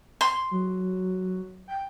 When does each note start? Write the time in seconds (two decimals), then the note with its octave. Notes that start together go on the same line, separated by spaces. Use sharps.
0.21 C6
0.51 F#3
1.68 G5